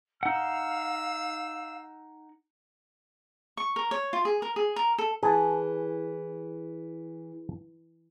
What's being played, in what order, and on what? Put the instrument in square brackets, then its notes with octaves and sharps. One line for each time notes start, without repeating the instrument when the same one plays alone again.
[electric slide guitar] D#4 F#5 [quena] F5 [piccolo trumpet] E6
[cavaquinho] C#6
A#4
C#5
F4
G#4
A#4
G#4
A#4
A4
[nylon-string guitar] E3 [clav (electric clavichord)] G#4 G#5 A5